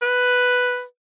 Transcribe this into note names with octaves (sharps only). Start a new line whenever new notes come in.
B4